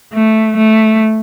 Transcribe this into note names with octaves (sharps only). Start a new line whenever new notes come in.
A3
A3